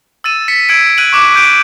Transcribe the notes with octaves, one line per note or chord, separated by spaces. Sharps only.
E6 A6 D#7 E7
B6 C#7
E6 G#6 B6 C#7 D7
F#6 D7 D#7 F#7
C#6 D6 F#6 E7
G6 D7